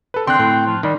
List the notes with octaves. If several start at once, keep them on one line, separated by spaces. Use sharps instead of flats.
A4 B4
D3 C4 C6 F#6
A2
F3
D#3 G3